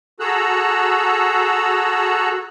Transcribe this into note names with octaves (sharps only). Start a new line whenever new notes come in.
F#4 G#4 A4 A#5 E6 F#6